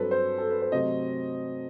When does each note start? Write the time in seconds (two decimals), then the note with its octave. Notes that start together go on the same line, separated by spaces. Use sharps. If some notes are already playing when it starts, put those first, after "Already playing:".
Already playing: G2 F#3 C4 A4 B4
0.11 C5
0.38 A4
0.50 B4
0.62 C5
0.72 C3 F#3 A3 C4 D#5